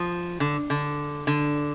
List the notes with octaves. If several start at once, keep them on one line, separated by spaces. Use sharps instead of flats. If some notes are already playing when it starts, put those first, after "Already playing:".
Already playing: F3
D3
D3
D3